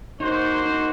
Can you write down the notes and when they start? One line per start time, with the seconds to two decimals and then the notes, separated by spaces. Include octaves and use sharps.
0.20 A#3 D#4 F#4 C5
0.66 D#4